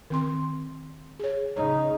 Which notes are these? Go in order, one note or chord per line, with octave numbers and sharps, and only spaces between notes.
D#3 C4 C6
G#4 C#5
C#3 D#4 C#5